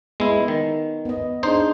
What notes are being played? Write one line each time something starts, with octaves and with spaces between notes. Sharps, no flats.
G#3 B3 E4
D#3
B3 D#5
D4 D#4 G#4 C5